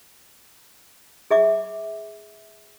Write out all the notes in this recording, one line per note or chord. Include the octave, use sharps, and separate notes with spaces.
G#4 E5 D6